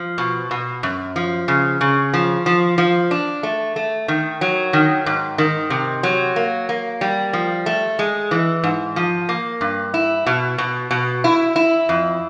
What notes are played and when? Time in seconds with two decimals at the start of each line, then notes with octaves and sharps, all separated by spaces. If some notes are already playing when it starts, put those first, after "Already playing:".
Already playing: F3
0.18 B2
0.51 B2
0.83 F#2
1.16 F3
1.48 C#3
1.81 C#3
2.14 F3
2.46 F3
2.78 F3
3.11 D4
3.43 A3
3.76 A3
4.08 D#3
4.41 F#3
4.73 D#3
5.06 G#2
5.38 D#3
5.70 C3
6.03 F#3
6.36 A#3
6.69 A#3
7.01 G3
7.33 F3
7.66 A3
7.99 G#3
8.31 E3
8.63 G#2
8.96 F3
9.29 A#3
9.61 G2
9.94 E4
10.26 B2
10.58 B2
10.91 B2
11.24 E4
11.56 E4
11.89 F2